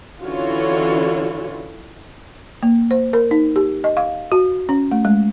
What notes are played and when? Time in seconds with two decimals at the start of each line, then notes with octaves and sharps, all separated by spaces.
0.23 D3 E3 C#4 F4 F#4 C#5
2.63 A#3
2.91 C5
3.13 A#4
3.31 D#4
3.56 G4
3.84 D#5
3.97 F5
4.32 F#4
4.69 C#4
4.91 A3
5.05 G#3